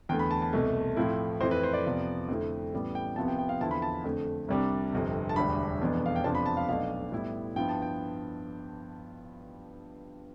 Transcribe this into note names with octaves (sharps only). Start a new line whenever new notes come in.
E2 D3 A3 G5
B5
A5
A5
C2 B2 A3
A2 F3 A3 C4 E4
F2 E3 A3 E4 C5
B4
C5
D5
F2 C3 F3 B3
F2 D3 A3 C4 E4
A1 A2 G3 B3
G5
C2 C3 F3 B3 A5
G5
G5
F5
E2 D3 F3 C4 E4 A5
B5
A5
F2 D3 A3
C2 C3 G3 D4
G1 F2 C3
A5
E1 D2 D3 G3 D4 B5
F1 E2 B2 B3 D4
F5
G5
F2 C3 F3 B3 D4 A5
B5
A5
F5
B1 B2 A3 D4 F5
A2 G3 B3 E4
G2 F3 B3 E4 G5
A5
G5